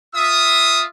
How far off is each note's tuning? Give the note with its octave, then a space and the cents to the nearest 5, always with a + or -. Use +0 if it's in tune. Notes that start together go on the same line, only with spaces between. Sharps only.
F4 +0 E5 +0 D#6 +0